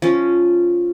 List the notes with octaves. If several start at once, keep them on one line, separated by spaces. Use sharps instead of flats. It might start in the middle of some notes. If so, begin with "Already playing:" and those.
F3 C#4